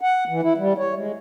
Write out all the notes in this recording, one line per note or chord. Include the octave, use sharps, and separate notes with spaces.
F#5
E3
E4
G3
C#5
G#3